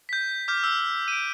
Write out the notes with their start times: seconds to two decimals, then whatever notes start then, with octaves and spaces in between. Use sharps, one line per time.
0.09 G6 B6
0.48 D6 F6 G6
0.64 E6
1.08 D7 D#7